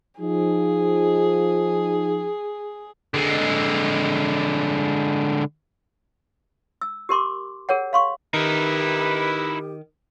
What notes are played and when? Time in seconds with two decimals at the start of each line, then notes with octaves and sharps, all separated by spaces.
0.20 F3 D#4 G#4
3.14 D3 G#3
6.81 E6
7.09 G4 A#4 C6 D6
7.69 G#4 A#4 C#5 F#5
7.93 F5 C6 C#6
8.34 D#3 D#4 E4 G4 B4